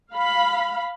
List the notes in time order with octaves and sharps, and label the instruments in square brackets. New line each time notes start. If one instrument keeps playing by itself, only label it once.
[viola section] F5 B5